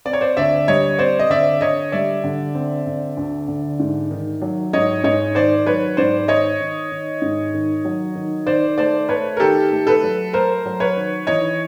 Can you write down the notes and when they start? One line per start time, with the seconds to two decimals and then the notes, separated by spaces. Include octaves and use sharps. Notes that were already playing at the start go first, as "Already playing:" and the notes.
0.05 C4 D5
0.13 C#5
0.21 C5 D5
0.37 D2 D5 E5
0.68 G3 C#5 D#5
0.99 C4 C5 D5
1.19 D#5
1.30 D3 D5 E5
1.61 D3 C#5 D#5
1.92 G3 D5 E5
2.24 D3
2.55 C4
2.86 D3
3.17 D2
3.48 D3
3.79 G#2
4.11 D#3
4.42 F#3
4.73 G#2 C#5 D#5
5.04 G#2 C#5 D#5
5.35 D#3 C5 D5
5.66 F#3 B4 C#5
5.97 G#2 C5 D5
6.28 D#3 C#5 D#5
6.61 D#3
6.91 D#3
7.22 G#2
7.54 D#3
7.85 F#3
8.15 D#3
8.46 D#3 C5 D5
8.78 A3 C5 D5
9.09 A3 B4 C#5
9.37 A#4
9.40 D#3 G4 A4
9.71 A3
9.87 A4 B4
10.03 F#3
10.33 A3 A#4 C5
10.66 F#3
10.80 B4 C#5
10.96 D#3
11.27 E3 C#5 D#5